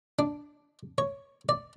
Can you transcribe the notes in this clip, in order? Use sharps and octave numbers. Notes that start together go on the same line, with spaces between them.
D4
C#5
D5